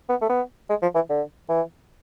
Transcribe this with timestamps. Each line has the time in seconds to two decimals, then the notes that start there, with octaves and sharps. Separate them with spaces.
0.09 B3
0.21 A3
0.29 B3
0.69 G#3
0.82 F3
0.95 E3
1.09 D3
1.49 E3